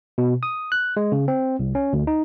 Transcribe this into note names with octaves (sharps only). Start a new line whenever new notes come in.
B2
D#6
F#6
G#3
C#3
C4
C2
C#4
D2
D#4